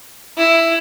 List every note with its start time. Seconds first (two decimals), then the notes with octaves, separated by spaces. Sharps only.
0.37 E4